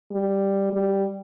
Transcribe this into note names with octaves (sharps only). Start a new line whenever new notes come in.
G3
G3